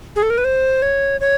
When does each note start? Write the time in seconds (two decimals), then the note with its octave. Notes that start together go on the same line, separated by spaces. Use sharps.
0.16 G#4
0.22 A4
0.30 A#4
0.38 B4
0.44 C5
0.82 C#5
1.21 C#5